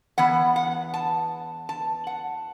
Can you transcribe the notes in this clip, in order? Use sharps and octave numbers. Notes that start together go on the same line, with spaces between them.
E2 E3 B3 F#5
F#5
A5
A5
F#5